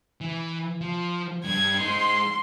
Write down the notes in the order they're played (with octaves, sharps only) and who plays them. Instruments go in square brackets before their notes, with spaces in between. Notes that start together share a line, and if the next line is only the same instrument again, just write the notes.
[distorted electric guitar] E3
F3
[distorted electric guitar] G2 [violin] G#6
[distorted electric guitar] G#3 D#4 [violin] C6